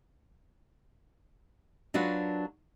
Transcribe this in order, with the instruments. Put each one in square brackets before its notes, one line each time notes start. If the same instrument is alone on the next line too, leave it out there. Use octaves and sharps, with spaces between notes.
[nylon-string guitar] F#3 D4 F4 F#4 A#4 B4